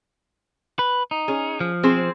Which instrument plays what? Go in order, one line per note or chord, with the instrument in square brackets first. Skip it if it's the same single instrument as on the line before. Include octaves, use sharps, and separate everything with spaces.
[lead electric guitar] B4
D#4
[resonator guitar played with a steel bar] C#4 G#4
[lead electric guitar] F3
[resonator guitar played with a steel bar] C4 G#4 C5